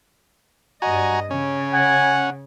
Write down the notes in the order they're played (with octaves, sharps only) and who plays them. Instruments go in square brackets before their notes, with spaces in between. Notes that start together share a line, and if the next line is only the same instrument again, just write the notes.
[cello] G2 D#5 [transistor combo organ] F#4 G#5 A#5
[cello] C#3 [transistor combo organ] C#4
[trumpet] F#5 [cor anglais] G#5